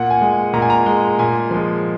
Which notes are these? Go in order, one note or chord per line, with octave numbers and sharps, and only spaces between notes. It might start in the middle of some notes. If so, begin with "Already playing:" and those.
Already playing: A#2 F#5
G#5
G#3
A#2 A#5
G#5
A#5
G#3
A#2 G#5
F3 G#3